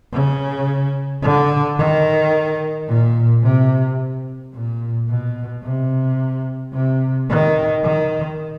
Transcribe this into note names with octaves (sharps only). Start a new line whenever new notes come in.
C#3
D3
D#3
A#2
C3
A#2
B2
C3
C3
D#3
D#3